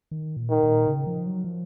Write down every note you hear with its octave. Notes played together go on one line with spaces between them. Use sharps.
D#3
A#2
D#3
A#2
C#3
F3
F#3
F3